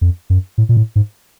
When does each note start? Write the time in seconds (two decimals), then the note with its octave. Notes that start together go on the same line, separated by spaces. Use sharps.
0.01 F2
0.30 F#2
0.58 A2
0.69 A#2
0.77 A2
0.96 G#2